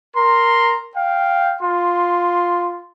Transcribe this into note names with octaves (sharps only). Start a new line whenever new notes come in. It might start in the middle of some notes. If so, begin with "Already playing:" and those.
A#4 A#5 C6
F5 G5
F4 C6